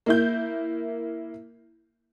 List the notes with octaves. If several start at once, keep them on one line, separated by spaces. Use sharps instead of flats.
A#3 E4 G6